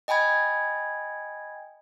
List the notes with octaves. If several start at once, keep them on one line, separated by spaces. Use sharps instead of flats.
D#5 G5 G#5 B5 G#6